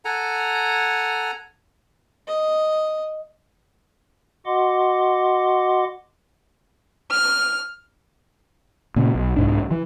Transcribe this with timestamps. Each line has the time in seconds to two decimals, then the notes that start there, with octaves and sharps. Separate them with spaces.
0.05 A4 F#5 G#5 A#5
2.28 D#5
4.46 F#4 D#5 F#5 C6 D6
7.11 F6
8.96 A#2 C#3
9.15 B1
9.36 C2 G#2 D4
9.71 E3